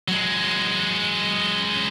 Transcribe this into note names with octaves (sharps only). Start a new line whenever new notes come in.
F#3 G#3